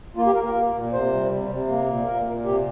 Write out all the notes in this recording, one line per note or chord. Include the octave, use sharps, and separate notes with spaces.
A#3 F4
G4
A#3 A#4
A#4
A#3
A#2
C3 C5
G3
C3
C3
A#3
A#2
A#2 A#4
A#2
C3 G4